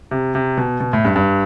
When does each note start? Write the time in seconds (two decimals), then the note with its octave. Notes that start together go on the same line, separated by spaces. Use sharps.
0.11 C3
0.35 C3
0.57 B2
0.80 B2
0.93 A2
1.05 G2
1.16 G2